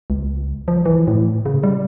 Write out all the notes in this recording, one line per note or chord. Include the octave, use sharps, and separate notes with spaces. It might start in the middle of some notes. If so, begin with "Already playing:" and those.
C#2
F3
E3
A2
C#3
G3